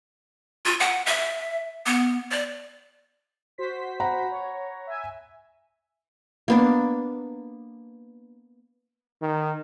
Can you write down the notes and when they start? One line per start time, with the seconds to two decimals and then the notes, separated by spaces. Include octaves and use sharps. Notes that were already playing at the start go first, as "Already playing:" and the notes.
0.65 F4
0.80 F#5
1.06 E5
1.86 B3
2.31 D5
3.58 F#4 C5 B6
4.00 F#5 A#5 B5
4.31 C#5
4.87 E5 G#5
6.48 A#3 B3 D4
9.22 D#3